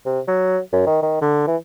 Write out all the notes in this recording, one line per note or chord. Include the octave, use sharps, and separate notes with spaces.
C3
F#3
F#2
D#3
D#3
D3
E3